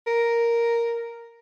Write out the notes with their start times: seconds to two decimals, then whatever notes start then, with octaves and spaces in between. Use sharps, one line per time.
0.07 A#4